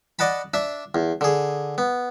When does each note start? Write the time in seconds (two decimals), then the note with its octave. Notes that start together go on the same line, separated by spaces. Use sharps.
0.19 D5 D#5 F#5 A5 B5
0.54 D4 E5
0.95 E2
1.21 D3 G#4
1.78 B3